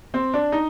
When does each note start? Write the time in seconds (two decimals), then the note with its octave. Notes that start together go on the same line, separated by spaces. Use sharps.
0.14 C4
0.34 D4
0.52 D#4